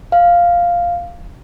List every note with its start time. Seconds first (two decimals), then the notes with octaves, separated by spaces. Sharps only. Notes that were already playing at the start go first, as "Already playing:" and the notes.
0.12 F5